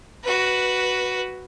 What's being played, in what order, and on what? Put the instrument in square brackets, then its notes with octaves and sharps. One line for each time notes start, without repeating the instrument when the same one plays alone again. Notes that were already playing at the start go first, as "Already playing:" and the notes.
[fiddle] F#4 B4